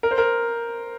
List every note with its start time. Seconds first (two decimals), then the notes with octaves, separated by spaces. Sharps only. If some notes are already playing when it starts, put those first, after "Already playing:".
0.03 A#4
0.11 C5
0.18 A#4